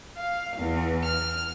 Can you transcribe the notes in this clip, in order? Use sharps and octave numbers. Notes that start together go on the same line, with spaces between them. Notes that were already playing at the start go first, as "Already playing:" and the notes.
F5
E2
F6